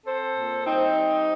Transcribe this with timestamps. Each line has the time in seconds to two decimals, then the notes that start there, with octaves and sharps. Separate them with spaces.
0.05 C4 A4 C5
0.35 A#2
0.65 G3 C4 D#4
0.96 G3